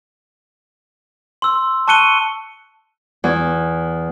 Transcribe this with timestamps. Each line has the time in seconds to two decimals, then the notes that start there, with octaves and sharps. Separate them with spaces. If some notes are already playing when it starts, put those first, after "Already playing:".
1.42 C6 E6
1.88 A5 C#6 F#6 C#7 D#7 G7
3.24 E2